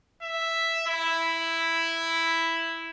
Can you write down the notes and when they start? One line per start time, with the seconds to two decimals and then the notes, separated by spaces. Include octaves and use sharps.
0.23 E5
0.87 E4